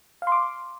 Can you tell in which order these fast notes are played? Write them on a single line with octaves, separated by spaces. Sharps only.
F5 C6 D6